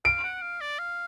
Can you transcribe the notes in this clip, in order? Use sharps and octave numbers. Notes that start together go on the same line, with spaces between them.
F5 D7
F#5
F5
D5
F5